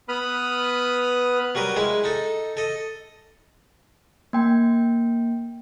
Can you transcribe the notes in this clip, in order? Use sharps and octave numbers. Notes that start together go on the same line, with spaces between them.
B3 B4 B5 D#6 F6
F#3 G3 A#4 B4
G#3 E4
D#4 A4
A4 D#5
A#3 G5